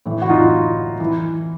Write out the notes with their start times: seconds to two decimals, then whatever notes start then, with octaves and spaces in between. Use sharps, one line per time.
0.06 A2 E3
0.22 F#4
0.29 D#4 F4
1.00 E3